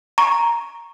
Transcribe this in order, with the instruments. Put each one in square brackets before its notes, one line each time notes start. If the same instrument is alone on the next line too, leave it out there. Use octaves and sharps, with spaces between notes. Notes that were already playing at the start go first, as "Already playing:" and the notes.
[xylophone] A#5 C#6